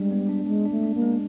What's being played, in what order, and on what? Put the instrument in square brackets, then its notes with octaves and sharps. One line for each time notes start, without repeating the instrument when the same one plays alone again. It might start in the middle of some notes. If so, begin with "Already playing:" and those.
Already playing: [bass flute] G3 [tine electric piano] G#3 D4
[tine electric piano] B3
D4
[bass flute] G#3 [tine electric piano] D4
[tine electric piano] D4
[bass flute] A3
[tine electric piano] D4
[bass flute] A#3
[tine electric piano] G#3